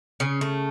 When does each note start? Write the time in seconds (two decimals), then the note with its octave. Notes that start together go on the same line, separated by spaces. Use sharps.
0.20 C#3 C#4
0.41 A3